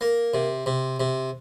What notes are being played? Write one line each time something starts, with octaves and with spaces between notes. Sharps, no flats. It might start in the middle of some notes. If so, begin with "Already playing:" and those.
A#3
C3
C3
C3